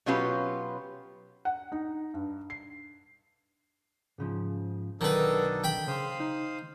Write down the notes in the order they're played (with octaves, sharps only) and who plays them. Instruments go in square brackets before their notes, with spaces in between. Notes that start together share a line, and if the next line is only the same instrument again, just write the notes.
[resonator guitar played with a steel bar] B2 F#3 C#4 F4 G4 B4
[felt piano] F#5
D#4
G2
C7
[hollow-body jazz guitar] G#2 C#3 F3
[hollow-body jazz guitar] B1 D3 F#3 [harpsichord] D#3 B4 [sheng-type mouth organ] D4 D#4 A4
[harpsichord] G5 B5
[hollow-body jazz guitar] C#3 C6 [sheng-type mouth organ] C5 F5 D#6
[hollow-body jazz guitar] D#4